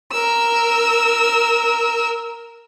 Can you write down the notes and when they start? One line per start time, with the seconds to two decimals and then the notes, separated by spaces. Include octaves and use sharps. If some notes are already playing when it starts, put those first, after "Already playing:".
0.11 A#4 E6